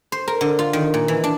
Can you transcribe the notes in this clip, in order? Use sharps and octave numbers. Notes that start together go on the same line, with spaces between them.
C5
A#4
D3
F4
D#3
A#2
E3
D4